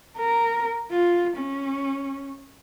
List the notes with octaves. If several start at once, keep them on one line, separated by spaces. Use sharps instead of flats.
A#4
F4
C#4